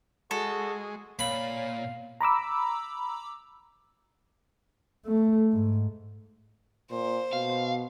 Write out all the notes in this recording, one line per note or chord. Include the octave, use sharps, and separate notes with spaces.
G#3 F#4 G#4 A4
A#2 C#5 F5 B5
A#5 B5 D6 E6
A3
G#2
A#2 C5
B2 F5